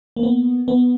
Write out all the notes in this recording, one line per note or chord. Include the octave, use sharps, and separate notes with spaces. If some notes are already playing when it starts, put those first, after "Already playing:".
A#3
B3
B3